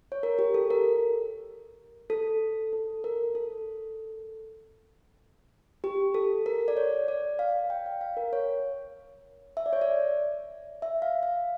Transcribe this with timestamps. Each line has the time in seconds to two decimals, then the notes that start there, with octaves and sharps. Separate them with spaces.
0.12 C#5
0.23 A#4
0.39 G4
0.54 A4
0.70 A#4
2.10 A4
2.73 A4
3.04 A#4
3.35 A4
5.84 G4
6.14 A4
6.46 A#4
6.68 D5
6.77 C#5
7.08 D5
7.39 F5
7.70 G5
7.86 F5
8.01 F5
8.17 A#4
8.33 C#5
9.57 E5
9.66 D5
9.73 C#5
9.81 D5
10.82 E5
11.02 F5
11.23 F5